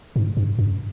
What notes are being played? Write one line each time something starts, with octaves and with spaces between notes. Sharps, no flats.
G#2
G2
F#2